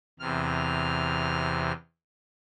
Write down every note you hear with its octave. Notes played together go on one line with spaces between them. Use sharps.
E2 C3 F6